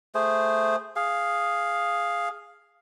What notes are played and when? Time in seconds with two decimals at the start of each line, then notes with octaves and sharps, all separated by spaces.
0.15 A3 G#4 C5
0.96 G#4 F5